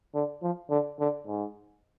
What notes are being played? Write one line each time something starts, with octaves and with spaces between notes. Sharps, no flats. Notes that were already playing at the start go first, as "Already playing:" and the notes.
D3
F3
D3
D3
G#2